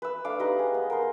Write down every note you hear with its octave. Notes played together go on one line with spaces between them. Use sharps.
B4 E6
A3 D4 F5 D6
D#4 G4 B4 D#5
G#4
B3
A#4 C5